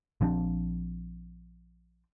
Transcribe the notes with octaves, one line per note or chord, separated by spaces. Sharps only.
A#1 F3 C4 D4